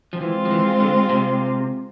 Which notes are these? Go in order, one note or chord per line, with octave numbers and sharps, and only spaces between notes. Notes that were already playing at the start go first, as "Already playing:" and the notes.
F3
E3 G#3 C4 F4
F3
E3
D3
C3